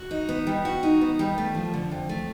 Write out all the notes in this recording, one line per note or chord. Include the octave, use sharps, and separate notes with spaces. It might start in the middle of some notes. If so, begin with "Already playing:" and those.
Already playing: F#4
D#4
B3
G3
F#4
D#4
B3
G3
A3
F3
D3
F2
A3